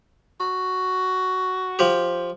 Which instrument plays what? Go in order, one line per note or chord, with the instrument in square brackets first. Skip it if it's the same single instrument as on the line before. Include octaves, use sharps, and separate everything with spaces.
[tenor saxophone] F#4
[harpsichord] F3 G4